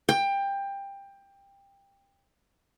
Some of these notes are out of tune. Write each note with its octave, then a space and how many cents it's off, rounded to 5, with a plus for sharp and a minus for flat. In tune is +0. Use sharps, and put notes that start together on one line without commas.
G5 +20